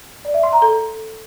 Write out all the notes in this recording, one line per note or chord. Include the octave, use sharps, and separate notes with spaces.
D5
E5
C6
A#5
A4